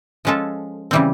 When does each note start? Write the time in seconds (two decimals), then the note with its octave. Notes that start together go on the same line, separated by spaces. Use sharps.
0.25 F3 G#3 C#4 F4 A4
0.91 C#3 E3 G3 C4